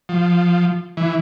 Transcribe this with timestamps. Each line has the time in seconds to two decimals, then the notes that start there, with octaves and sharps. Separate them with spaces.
0.09 F3
0.97 E3